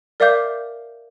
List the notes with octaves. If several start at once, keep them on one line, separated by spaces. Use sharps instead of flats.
A#4 D5 E5 F5 D6 G6